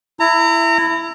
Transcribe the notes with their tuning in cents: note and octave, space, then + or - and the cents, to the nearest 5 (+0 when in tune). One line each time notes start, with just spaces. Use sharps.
E4 +10 A#5 -30